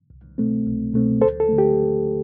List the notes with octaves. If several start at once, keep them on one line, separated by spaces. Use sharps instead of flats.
C2
B2 A3 C4
C2
B2 A3 C4
D2 A4 C5
A4
D3 A3
G4